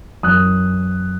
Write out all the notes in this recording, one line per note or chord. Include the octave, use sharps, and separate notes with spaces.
F#2 E3 D#6 F#6